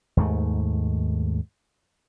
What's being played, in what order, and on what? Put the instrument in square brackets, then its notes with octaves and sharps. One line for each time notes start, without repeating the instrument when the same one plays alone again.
[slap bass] D#2 G#2 A3